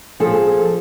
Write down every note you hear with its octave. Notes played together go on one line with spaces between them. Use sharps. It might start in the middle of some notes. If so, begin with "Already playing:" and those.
F3 G#4 A4